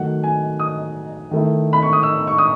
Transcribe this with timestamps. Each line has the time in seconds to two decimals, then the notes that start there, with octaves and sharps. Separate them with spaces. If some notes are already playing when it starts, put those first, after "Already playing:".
Already playing: D#3 F#3 A3 D#4 F#5
0.24 G#5
0.60 D#6
1.31 D#3 A3 E4
1.73 B5
1.83 C#6
1.93 D#6
2.03 E6
2.27 C#6
2.38 D#6